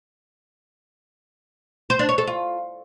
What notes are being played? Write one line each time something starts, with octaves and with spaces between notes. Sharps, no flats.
C5
D4
C#5
A4
F4